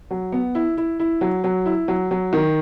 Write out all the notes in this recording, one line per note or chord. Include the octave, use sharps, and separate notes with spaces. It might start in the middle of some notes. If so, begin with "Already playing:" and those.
F#3
B3
E4
E4
E4
F#3
F#3
E4
F#3
F#3
D#3